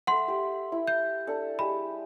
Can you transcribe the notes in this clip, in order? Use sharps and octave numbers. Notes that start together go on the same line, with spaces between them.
A4 E5 F#5 B5 C6
G4 G5
E4
G6
D4 A4
G#3 G4 B5